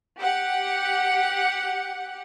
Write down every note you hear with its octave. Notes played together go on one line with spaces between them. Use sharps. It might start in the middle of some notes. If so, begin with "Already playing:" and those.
G4 F#5